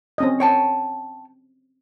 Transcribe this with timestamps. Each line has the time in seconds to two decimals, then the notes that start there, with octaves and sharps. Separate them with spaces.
0.18 C4 C#4 D#5
0.40 C#5 G5 A5